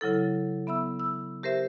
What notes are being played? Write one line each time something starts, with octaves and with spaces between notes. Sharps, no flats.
C#3 F#3 E4 A4
B3 E5 B5 E6
E6
G4 A#4 C5 E5